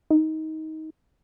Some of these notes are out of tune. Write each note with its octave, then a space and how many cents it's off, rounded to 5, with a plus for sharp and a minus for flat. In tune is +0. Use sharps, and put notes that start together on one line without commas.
D#4 +20